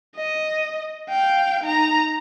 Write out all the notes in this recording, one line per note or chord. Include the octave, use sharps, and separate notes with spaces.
D#5
F5 G5
D#4 A#5